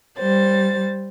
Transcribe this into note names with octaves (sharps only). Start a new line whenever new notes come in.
G3 C5 A6